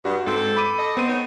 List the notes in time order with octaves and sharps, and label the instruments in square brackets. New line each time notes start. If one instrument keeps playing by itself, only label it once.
[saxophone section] G2 [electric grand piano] F#4
[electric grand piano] G#2 [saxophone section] C4 A4
[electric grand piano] B5 D6 D#7
[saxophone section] A4 D#5
[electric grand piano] B3 D#7 [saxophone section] C4
[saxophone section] D#4 C#5